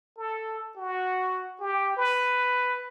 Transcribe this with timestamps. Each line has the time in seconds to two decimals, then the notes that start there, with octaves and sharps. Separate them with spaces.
0.17 A4
0.77 F#4
1.60 G4
1.97 B4